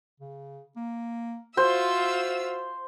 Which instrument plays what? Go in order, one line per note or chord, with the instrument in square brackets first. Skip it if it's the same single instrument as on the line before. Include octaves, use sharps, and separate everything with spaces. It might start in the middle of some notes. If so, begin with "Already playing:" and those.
[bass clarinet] C#3
A#3
[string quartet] F4 E5 E6 [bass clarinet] F#4 [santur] C5